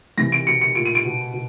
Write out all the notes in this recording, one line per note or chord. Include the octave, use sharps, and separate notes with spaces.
C3 E3 A#6
D7
B2 C#7
C#7
A#2 D7
D#7
D7
B2
B2